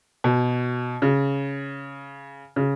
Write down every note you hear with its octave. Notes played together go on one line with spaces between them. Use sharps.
B2
C#3
C#3